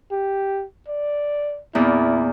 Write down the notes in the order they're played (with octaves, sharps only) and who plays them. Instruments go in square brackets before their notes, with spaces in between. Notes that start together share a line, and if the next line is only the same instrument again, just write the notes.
[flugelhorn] G4
D5
[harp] E2 A#2 C4 [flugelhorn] E4